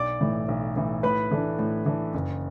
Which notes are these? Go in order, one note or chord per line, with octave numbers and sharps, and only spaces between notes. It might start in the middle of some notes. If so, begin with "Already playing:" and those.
Already playing: B1 D5 D6
A2 E3
B1
A2 E3
A2 B4 B5
E3 A3 D4
A2
E3 A3 D4
F#1